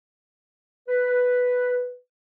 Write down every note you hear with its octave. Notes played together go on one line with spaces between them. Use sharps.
B4